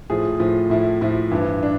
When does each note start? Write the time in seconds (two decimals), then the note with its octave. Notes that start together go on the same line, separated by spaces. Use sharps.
0.10 A2 F3 G#4
0.40 A2 F3
0.70 A2 F3 E4
1.01 A2 F3 E4
1.31 G2 E3
1.63 D4